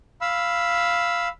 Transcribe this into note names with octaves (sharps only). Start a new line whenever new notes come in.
F5 B5 E6